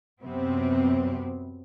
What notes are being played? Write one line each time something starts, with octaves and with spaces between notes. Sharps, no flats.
F#2 C3 B3 C4